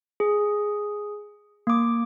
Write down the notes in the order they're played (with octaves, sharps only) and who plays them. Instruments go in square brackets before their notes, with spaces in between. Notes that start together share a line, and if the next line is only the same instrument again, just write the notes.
[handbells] G#4
A#3 D6